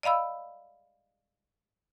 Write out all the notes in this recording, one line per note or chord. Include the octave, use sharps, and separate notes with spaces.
D5 D#5 F5 B5 E6